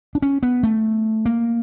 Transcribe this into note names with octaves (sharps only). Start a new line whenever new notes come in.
D4
C#4
B3
A3
A#3